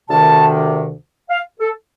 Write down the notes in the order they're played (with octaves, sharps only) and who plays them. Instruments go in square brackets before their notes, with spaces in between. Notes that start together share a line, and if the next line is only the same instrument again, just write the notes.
[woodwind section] D2 C3 D#3 A5
F5
A4